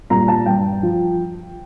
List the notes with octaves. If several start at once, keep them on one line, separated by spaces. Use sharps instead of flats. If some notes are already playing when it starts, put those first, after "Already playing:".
A#2 G3 A#5
A5
G2 G5
F3